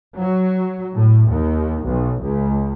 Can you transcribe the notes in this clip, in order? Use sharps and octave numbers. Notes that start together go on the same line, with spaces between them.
F#3
A2
D#2
B1
C#2